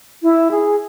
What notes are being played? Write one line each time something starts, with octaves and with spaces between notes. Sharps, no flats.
E4
G#4